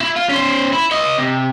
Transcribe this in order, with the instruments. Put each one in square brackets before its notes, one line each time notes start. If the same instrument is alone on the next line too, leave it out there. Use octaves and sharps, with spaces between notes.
[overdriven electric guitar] E4
F4
C#4 C5
E4
C#5 D#5
C3